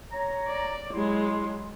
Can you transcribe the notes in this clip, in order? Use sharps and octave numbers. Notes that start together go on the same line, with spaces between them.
C#5 A#5
D5
F#3 G#3 E4 C6